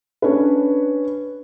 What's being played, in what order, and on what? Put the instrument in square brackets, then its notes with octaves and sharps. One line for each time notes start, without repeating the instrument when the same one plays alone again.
[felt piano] C#4 D4 B4